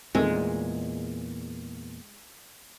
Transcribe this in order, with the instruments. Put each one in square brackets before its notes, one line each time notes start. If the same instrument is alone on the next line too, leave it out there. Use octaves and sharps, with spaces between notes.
[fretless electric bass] E2 A#2 [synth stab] D#3 A3 C4 [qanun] G#3